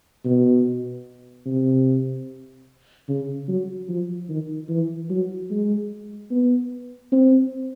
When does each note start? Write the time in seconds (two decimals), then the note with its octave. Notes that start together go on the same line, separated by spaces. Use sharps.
0.25 B2
1.46 C3
3.08 C#3
3.48 F#3
3.89 F3
4.29 D#3
4.69 E3
5.10 F#3
5.50 G#3
6.31 B3
7.12 C4